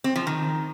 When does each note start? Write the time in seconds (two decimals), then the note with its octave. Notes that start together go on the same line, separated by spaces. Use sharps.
0.04 C4
0.16 F3
0.27 D#3